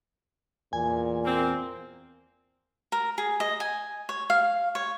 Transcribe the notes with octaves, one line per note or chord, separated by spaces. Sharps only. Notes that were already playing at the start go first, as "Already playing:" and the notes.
E2 A#2 G#5
A#3 C4
A#4
G#4
D#5
G#5
C#5
F5
C#5